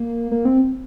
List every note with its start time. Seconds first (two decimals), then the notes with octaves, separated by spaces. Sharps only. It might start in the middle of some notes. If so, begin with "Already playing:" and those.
Already playing: A#3
0.31 A#3
0.45 C4